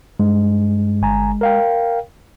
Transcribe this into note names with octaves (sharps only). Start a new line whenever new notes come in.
G2 G#3
G1 G#5 A#5
A#4 F5 G5